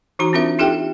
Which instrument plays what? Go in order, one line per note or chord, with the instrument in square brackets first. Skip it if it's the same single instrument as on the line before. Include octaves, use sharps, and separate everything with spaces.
[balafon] E3 D#4 F#4 A#5
C4 D4 F4 A#4 E5
D#4 F4 G4 A4 E5 G5